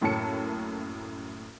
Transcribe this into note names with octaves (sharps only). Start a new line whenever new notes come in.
F#2 A2 A#3 C#5 A5 C#7